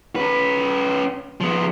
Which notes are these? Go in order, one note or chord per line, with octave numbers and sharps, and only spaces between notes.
C#4 B4
F3 B3